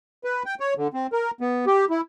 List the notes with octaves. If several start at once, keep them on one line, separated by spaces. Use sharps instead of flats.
B4
G5
C#5
D3
C4
A#4
B3
G4
E4